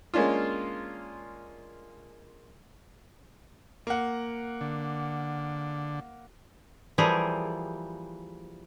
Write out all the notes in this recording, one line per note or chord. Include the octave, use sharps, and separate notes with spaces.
G#3 A#3 C#4 D4 F4
A#3 F#5
D3
E3 F3 G3 A#3 G4 G#4